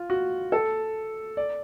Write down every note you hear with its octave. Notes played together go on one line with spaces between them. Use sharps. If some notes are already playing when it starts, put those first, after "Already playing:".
Already playing: F4
F#4
A4
D5